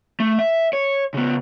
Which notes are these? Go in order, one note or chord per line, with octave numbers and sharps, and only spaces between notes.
A3
E5
C#5
C#3 B3